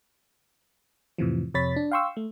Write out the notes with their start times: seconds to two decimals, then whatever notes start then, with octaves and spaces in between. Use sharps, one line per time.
1.18 F2 A2 C3 E3 F3
1.54 F2 C3 C#5 B5 A6 B6
1.76 D4
1.92 F5 G5 C6 C#6 E6
2.17 A3